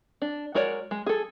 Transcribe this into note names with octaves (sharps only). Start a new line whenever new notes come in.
D4
G#3 F#4 A#4 C#5 D5
G#3
G#4 A4